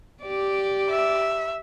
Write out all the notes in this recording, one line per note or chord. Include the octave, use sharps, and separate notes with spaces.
G4 D5
E5